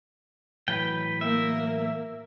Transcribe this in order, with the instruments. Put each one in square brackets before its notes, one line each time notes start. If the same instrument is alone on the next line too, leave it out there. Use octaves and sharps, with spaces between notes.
[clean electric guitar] A2 E3 F#3 [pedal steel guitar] B4 G5
[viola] A#3 [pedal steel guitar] E5